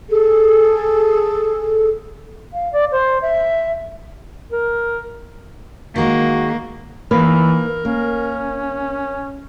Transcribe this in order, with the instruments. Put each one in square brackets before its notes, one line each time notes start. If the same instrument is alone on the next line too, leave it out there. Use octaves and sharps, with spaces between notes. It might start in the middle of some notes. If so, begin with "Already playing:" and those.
[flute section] G#4 A4
[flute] F5
D5
C5
E5
[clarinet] A#4
[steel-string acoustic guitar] D#3 G#3 [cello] A#3 [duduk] F#4
[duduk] E3 [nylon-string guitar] A#3 D#4 B4 [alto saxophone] A#4
[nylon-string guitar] A#3 [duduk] C#4